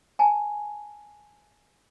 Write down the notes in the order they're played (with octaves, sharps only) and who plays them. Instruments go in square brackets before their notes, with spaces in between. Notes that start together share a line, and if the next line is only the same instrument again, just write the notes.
[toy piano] G#5 A5